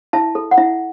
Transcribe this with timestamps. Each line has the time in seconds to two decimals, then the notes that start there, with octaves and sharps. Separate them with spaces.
0.13 E4 E5 A5
0.35 A4
0.51 F#5
0.58 E4 E5